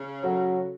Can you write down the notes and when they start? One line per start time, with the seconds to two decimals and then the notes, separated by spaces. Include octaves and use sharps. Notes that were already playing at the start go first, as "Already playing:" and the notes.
Already playing: C#3
0.23 F#3 C#4 F#4 A4